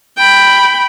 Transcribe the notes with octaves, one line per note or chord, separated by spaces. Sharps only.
G5 B5